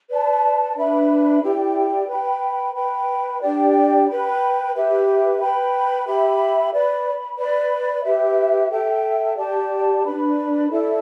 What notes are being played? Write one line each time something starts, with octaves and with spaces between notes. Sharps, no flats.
B4 D5 A5
D4 B4 E5 B5
E4 G4 D5 G5
B4 G5 B5
B4 G5 B5
D4 G4 D5 G5
B4 G5 B5
G4 B4 E5
B4 G5 B5
G4 E5 B5
B4 D5 B5
B4 D5 B5
G4 B4 E5
A4 E5 G5
G4 D5 A5
D4 B4 D5 B5
E4 A4 D5